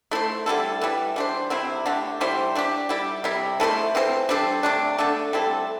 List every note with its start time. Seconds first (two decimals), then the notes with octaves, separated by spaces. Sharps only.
0.11 A3 E4 C5
0.46 D3 G3 E4 A4
0.81 E3 G3 E4
1.16 G3 D4 A4 C5
1.50 C3 G3 C4 E4
1.86 D3 A3 D4 G4
2.21 C3 G3 E4 C5
2.55 A3 D4 G4
2.89 G3 E4 G4
3.24 C3 G3 E4
3.60 A3 E4 A4 C5
3.95 E3 C4 A4 C5
4.29 G3 D4 A4 C5
4.63 C3 A3 D4
4.98 D3 A3 D4 A4
5.33 G3 C4 E4 A4